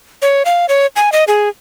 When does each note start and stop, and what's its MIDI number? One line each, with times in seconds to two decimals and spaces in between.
0.22 0.43 73
0.45 0.66 77
0.69 0.86 73
0.96 1.12 80
1.12 1.24 75
1.28 1.49 68